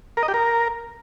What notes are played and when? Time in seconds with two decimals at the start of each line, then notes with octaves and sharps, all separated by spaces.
0.17 A#4
0.23 D#5
0.28 G4
0.34 A#4